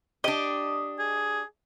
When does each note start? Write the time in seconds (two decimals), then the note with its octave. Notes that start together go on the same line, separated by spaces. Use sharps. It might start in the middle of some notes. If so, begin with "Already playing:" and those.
0.24 D4 G4 D#5
0.99 G#4